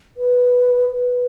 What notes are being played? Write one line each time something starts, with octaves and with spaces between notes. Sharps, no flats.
B4
B4